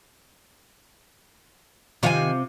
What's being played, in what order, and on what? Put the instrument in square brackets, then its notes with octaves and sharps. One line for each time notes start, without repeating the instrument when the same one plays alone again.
[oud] C3 C4 F4 [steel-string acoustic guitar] D#3 F#5 G#5